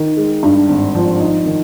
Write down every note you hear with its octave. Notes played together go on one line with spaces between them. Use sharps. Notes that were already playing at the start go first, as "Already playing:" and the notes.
Already playing: D#3
G#3
G2
G#1
F3
D#4
D#3